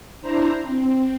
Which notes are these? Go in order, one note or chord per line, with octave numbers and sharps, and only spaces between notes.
D4 E4 C5 A#5
C4